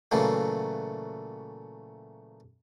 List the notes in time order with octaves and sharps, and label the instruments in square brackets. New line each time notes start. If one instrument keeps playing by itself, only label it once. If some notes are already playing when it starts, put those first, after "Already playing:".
[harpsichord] A#2 C#3 E3 F#3 A3